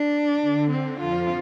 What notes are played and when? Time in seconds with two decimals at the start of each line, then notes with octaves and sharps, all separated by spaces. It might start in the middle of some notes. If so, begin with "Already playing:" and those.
Already playing: D4
0.42 D3
0.71 C4
1.00 F2 F3 F4